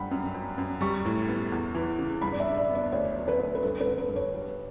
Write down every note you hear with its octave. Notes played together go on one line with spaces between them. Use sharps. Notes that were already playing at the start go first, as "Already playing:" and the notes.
Already playing: G2 F#5 G5 B5
F#2
F#2
F#2
G3 C#6
A2
B3
E2
E3
C#3
G2 B5
D5
E5
D4
D5
B3
D5
D2 C#5
F#3
B4
D2
B4
G2 A4
B4
D3
B4
G2
C#5
G3 C#5